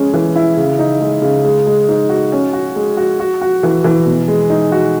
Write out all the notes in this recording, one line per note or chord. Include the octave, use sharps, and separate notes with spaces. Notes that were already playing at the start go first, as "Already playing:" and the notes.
Already playing: G#3 C#4
E3
E4
C#3
D#4
G#3
C#3
G#3
G#3
D#4
F#4
C#4
F#4
G#3
F#4
F#4
F#4
E3
E3
B2
G#3
D#4
F#4